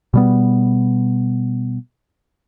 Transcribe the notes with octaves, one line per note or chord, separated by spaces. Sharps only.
B2 G3 B3